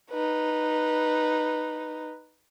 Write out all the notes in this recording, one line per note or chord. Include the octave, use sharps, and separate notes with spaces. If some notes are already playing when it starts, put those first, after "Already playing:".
D#4 B4